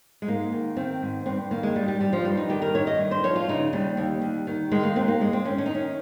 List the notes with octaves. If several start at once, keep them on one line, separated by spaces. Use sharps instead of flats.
G#3
G#2 A#3
D#3
D#3 C4
G#2
G2 C4
D#3 A#3
G#3
D#3 G3
G3
G2 G3
F3
G2 G3
D#4
D#3 G4
A#4
D#3 C#5
D#5
G2
C5
F3 C#5
F4
C#3 D#4
D#2 G3
D#2
D#2
D#3
D#3 G#3
A#3
D#2 C4
A#3
G2 G#3
C4
D#3 C#4
C#4
D#4
D#3
C#4